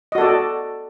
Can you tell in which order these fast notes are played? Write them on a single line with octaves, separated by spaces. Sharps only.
D#5 F#4 A4 D5